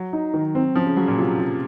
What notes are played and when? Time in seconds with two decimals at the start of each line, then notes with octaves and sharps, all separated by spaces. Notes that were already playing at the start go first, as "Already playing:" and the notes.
Already playing: F#3
0.13 D#4
0.34 D#3
0.55 C4
0.75 F3 C#4
0.86 C#3
0.97 C#3 F#3
1.08 A#2
1.18 C3 F4
1.39 F4